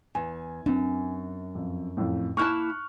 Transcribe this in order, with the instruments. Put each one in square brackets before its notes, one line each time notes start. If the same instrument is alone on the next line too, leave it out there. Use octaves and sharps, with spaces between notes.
[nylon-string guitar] E2 [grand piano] G#5
[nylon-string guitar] F#2 [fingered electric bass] C4 D4
[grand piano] F2
F2 A2
[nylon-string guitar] A#3 E4 A5 [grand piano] C#6 F6 F#6